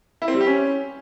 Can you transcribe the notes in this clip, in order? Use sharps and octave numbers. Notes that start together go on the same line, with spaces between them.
E4
C4
G3
G4
C#4